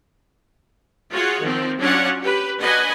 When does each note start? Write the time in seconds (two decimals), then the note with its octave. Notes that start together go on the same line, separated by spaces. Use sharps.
1.12 F4 F#4 G#4 C#5 F#5
1.41 D#3 F3 C4
1.79 F#3 C#4 D4 F4 C#5 F#5
2.22 G4 B4
2.58 D4 F#4 B4 D#5 F#5 G#5